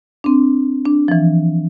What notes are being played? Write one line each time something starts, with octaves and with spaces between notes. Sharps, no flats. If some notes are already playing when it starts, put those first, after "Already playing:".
C4 D4
D4
E3 F3